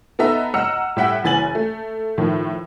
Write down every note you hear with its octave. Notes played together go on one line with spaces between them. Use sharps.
B3 D#4 A4 D#5 E5 A#5
D#5 F#5 A#5 E6 F6 C#7
A2 G3 E5 F#5 G5 B6
F#1 E3 G#5 A6 F#7
A3
A2 D#3 F3